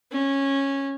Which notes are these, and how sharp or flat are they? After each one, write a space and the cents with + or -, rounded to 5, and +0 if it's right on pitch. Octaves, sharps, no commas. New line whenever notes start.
C#4 -15